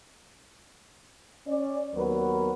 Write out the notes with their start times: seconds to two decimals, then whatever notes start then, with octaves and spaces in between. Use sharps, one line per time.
1.48 C#4 D5
1.95 D#2 F#3 B3 F#4 A#4 B4